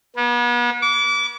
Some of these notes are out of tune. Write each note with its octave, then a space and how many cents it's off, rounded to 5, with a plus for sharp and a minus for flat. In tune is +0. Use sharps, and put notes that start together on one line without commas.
B3 -40
D6 -30